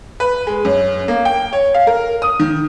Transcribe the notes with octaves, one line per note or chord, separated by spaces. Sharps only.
B4
G#3
F#2
A#3
G5
C#5
F5
A#4
D#6
D#3